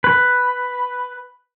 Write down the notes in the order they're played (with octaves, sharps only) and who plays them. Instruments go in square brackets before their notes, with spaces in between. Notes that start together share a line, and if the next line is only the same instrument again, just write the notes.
[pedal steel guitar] B4